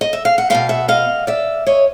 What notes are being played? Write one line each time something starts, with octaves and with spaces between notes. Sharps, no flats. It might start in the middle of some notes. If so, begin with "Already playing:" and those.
D#5
E5
F5
F#5
B2 G#3 B3 F5 G5
E5 F#5
D#5 F5
D5 E5
C#5 D#5